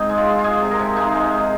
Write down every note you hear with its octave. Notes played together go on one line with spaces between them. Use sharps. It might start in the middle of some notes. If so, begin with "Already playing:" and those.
Already playing: G#2 C4 D#4
G#3
F4
G#3
F4
G#3 G#4
C3
A#4
C3
G#3 D#4
G#3
G#3